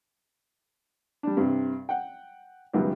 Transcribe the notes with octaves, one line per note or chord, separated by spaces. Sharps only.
G3 D4
G2 C3
F#5 G5
C#2 F#2 D#3 F#3 G3 B3